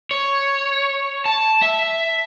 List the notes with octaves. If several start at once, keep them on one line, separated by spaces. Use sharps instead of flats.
C#5
A5
E5